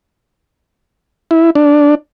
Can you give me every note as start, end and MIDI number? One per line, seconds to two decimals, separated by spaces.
1.31 1.50 64
1.55 1.95 62